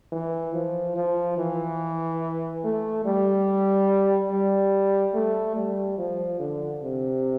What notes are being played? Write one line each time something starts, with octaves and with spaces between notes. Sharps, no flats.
E3
F3
F3
E3
A3
G3
G3
A3
G3
F3
D3
C3